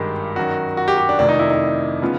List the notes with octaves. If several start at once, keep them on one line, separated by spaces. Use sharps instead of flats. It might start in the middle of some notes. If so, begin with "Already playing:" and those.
Already playing: G#1 G2 D#3 G#3 G4
F#2 D#3 F#3 F#4
F#4
G4
G4
D4
F1 F2 C3 D#3 D4
D#4
E4
D#4
C#3 F3 B3